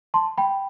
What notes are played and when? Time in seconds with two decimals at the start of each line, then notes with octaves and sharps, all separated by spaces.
0.14 A5 C6
0.38 G5 B5